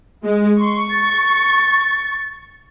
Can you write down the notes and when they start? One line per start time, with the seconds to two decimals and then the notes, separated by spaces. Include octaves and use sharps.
0.24 G#3
0.59 C6 C#6
0.91 A6